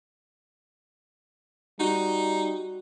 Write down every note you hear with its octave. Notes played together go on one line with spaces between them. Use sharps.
G3 D#4 F#4